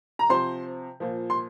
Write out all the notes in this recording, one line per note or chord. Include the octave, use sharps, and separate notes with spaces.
A#5
C3 F3 C5 C6
A#2 F3
C6